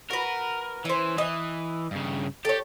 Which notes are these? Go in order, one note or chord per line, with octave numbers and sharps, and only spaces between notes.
F#4 A#4 B4
E3 C#4 C5
E3 D#5
G2 C#3
G4 A4 C#5